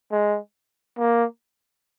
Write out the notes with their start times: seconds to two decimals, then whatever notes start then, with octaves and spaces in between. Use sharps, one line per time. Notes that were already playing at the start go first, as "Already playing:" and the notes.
0.12 G#3
0.98 A#3